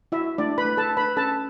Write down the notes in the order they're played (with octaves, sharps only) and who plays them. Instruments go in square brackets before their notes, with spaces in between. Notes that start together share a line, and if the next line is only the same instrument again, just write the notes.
[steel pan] E4 F#4 E5
A3 D4 D5
B4 B5
A3
A4 A5
D4
B4 B5
C#4 A4 A5